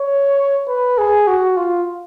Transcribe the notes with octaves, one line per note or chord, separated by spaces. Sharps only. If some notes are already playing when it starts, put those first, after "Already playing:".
Already playing: C#5
B4
G#4
F#4
F4